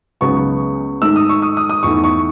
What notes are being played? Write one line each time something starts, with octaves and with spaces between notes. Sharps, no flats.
C#2 C#3 F#3 B3 D#4 C#6
G#2 D#3 A3 E6
D#6
C#6
D#6
D#6
D#6
E2 D#3 A3 E4 C#6
C#6